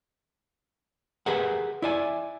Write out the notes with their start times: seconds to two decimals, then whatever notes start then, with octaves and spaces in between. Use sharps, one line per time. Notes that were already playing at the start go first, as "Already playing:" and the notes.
1.26 G4 G#4 A#4 B4 F#5
1.82 E4 D5 G#5